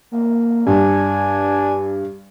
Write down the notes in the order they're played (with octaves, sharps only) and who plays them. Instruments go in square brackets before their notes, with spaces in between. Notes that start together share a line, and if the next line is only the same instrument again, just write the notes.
[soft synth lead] A#3
[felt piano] G2 [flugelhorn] D4 [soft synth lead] G#5